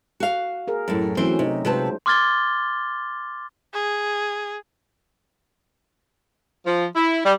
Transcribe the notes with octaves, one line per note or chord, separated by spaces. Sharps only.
F#4 F5
G#4 A#4
F#2 A2
E3 F#3 A3 C4 C#4 C5
C3 D#4
C3 G#3 F4 B4 C5 A5
C6 D6 F6 G#6 A6 G7
G#4
F3
E4
G3